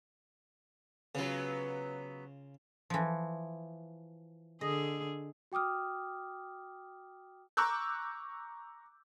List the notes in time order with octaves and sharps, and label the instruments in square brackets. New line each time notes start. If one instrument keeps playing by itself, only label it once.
[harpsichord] C#3 F4 [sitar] F#3 B3
[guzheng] E3 F3
[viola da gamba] D3 G#4 [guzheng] D#5
[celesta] F#4 G5 D6 D#6 F6
[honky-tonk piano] A#5 C#6 D6 E6 F#6 G6